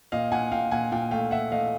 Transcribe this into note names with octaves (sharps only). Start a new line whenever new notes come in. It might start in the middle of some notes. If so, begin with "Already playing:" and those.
A#2 D#5 F5
A#2 F#5 G#5
A#2 F5 G5
A#2 F#5 G#5
A#2 F5 G5
A3 F5 G5
A3 E5 F#5
A3 D#5 F5